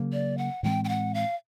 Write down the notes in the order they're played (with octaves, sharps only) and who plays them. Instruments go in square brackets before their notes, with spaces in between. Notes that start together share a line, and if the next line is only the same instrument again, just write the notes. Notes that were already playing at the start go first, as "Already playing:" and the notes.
Already playing: [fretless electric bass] C#3 F#3 A#3
[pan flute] D5
F#5
[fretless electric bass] A2 E3 G#3 C4 [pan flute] G5
[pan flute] G5
F#5
F5